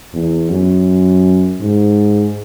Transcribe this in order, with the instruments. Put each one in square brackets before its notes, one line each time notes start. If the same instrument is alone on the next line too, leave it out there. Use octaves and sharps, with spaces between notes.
[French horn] E2
F#2
G#2